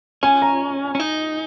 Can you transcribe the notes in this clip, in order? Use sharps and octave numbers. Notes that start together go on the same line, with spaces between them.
C#4 G#5
A#5
C#4
D#4